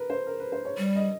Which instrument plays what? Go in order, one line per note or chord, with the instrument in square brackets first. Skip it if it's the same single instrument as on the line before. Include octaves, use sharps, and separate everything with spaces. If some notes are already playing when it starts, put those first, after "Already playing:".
Already playing: [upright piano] A#4 B4
C5
A#4
B4
C5
C#5
[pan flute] G3
[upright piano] D#5